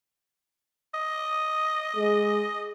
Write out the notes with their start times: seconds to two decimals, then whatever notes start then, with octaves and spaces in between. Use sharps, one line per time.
0.94 D#5
1.96 G#3